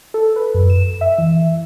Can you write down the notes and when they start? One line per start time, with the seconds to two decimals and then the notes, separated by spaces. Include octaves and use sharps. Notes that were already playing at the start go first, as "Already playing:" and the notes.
0.14 A4
0.36 B4
0.54 F#2
0.70 E7
1.01 E5
1.18 E3